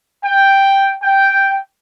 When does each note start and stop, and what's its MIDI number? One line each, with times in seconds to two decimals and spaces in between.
0.24 0.92 79
1.03 1.58 79